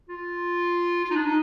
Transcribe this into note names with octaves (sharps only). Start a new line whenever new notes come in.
F4
F4
D#4
D4
D#4